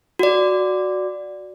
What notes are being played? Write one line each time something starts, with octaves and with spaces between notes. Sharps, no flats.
F#4 D5